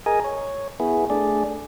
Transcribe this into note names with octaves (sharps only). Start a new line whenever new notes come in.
G#4 A#4 D#5 G#5
C#5
B3 E4 G#4
A3 D4 G#4 D5